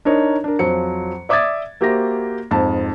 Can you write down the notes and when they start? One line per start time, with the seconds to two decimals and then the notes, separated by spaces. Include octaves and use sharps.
0.05 D4 D#4 A#4 C#5 D#5
0.44 D4 A#4
0.59 F2 F3 F#3 C#7
1.29 D5 E5 D6 D#6 G#6 A6
1.81 A#3 F#4 G4 C5 E5 A#6
2.51 F2 G#2 A5